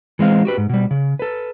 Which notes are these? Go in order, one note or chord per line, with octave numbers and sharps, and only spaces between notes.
E3 G#3 C4 F5
F#4 G4 B4
G#2
B2 G3
C#3
A4 B4